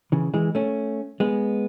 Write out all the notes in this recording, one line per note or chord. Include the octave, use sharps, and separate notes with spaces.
C#3 E3
E3 G#3
A3 C#4
G#3 B3